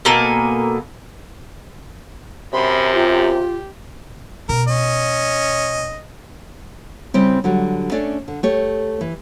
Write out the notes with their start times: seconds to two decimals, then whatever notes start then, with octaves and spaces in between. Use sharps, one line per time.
0.05 B2 A#3 A4 G#5
2.53 F#2 C3 B5 C6
2.94 F4 G4
4.49 B2 A#4
4.68 C#4 D#5
7.14 C#3 G3 C4 E4
7.44 D3 F#3 G3 F#4
7.91 A3 C#4 D4 A4 D5
8.28 D3
8.43 A3 G4 C#5
9.01 E3